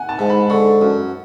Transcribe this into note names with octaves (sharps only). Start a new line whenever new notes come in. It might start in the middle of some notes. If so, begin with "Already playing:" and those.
Already playing: F#5 G#5
A5
G#2
B5
D3 C#6
F#2